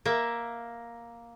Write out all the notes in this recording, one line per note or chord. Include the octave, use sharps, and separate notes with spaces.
A#3 E5